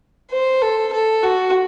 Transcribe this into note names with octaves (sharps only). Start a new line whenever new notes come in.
C5
A4
A4
F#4